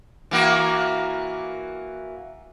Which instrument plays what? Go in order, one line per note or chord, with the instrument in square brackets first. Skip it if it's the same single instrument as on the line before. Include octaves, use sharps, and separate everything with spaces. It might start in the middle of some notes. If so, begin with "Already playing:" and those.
[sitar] E3 A#3 F#4